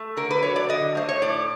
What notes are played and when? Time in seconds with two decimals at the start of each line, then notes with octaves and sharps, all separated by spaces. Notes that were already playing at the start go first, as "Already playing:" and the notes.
Already playing: A3
0.17 D3 A#4
0.31 B4
0.43 F#3 C#5
0.56 D5
0.69 D3 D#5
0.95 A3 C5
1.09 C#5
1.22 A2 D5